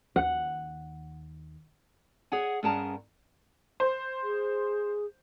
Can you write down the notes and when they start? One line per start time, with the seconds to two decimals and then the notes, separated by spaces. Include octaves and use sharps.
0.16 D#2 F#5
2.32 G#4 C#5 F#5 G#5
2.63 G2 B3 C#4 G#4 A#4 A5
3.80 C5
4.23 G#4